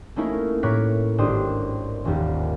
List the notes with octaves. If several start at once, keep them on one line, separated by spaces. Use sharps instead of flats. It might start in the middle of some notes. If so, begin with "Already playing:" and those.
A3 A#3 C#4 D#4 E4 A#4
A2 A#4 C#5 D6 F#6 B6
G#1 D4 G4 C5 D#6
D#1 D#2